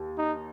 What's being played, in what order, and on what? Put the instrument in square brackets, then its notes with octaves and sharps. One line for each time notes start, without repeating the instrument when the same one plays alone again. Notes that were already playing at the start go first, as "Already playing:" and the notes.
Already playing: [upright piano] D#2
[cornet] D#4